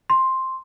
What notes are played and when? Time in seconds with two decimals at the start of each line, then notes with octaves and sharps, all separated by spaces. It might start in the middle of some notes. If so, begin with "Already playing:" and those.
0.10 C6